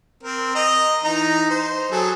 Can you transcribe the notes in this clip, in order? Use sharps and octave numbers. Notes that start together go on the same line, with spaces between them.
C4 A#4
D#5 A#5
E3 D#4 A#5
C5
F#3 G#4 A4